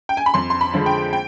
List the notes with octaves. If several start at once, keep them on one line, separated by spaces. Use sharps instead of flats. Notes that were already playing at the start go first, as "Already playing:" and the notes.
G5
G#5
B5
F2 C6
C6
B5
D3 F3 G#3
G5
G5